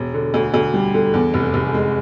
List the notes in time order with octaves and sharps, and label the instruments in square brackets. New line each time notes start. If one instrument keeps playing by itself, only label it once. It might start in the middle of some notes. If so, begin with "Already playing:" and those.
Already playing: [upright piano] E1
D3
D2
D2
G3
D3
E2
F1
F1
G#3